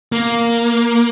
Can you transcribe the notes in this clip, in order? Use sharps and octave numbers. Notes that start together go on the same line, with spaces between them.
A#3